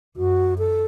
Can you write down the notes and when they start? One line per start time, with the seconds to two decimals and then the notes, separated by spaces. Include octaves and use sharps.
0.16 F#2 F#4
0.58 A4